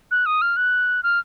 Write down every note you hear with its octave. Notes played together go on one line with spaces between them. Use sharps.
F#6
D#6
F6
F#6
F6